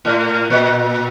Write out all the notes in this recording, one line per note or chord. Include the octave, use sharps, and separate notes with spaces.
A2
A#2